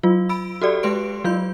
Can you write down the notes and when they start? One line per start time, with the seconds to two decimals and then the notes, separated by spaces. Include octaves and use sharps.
0.03 F#3 F4
0.29 B5 E6 D7
0.62 F#4 G4 A4 D5
0.83 G#3 G4 B4 C6 D7
1.24 F#3 F4 G6